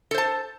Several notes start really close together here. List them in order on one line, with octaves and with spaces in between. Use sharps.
A4 C5 A5